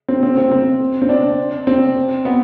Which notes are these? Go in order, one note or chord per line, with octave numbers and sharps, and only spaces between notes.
C4
C4
C4
C4
C4
D4
C4
B3